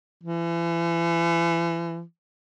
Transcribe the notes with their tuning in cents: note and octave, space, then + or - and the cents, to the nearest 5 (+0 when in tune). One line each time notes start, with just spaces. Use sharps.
E3 +35